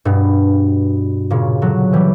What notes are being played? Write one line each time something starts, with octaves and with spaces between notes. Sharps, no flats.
G2 B2
A#2 C#3
D3 F#3
E3 G3